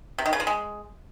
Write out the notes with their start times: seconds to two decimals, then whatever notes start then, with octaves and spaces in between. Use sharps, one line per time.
0.18 C3
0.26 D#3
0.33 C#3
0.40 F3
0.47 G#3